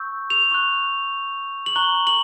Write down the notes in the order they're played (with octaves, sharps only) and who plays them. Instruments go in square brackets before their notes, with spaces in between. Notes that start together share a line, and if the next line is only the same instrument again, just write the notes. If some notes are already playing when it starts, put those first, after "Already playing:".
Already playing: [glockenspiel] C#6 E6 G6
F7
C#6 F#6
F#7
A#5 C#6 F#6 G7
F#7